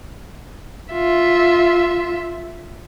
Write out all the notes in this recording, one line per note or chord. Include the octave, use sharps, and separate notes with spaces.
F4 E5